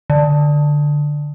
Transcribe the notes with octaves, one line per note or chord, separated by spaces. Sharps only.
D3